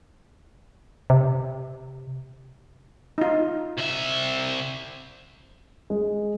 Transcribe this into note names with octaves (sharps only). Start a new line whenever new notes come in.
C3
D#4 F4
C2 E5
G#3